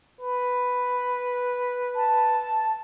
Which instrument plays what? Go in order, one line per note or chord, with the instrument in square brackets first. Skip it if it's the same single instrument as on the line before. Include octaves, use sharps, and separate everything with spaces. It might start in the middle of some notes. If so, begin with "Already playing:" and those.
[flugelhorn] B4
[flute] A5